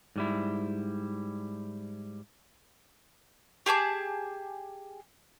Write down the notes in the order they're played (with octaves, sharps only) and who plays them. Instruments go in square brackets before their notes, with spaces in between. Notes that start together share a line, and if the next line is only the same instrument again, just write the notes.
[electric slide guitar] G#2 G3 E4
[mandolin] G4 G#4 A5 D6